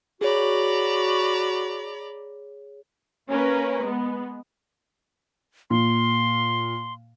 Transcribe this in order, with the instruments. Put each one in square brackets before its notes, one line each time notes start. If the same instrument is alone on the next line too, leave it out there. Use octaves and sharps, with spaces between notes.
[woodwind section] F#4 [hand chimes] G#4 C#5 [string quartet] D5 A#5 B5
[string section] A#3 C#4 A#4 B4
G#3 B3
[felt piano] A#2 [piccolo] C6